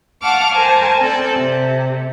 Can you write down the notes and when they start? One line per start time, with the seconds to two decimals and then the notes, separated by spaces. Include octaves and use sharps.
0.22 F5 F#5 A5 C#6 D6 F6
0.52 A#4 C5 G#5 A5
1.00 C4 A4 D5
1.36 C3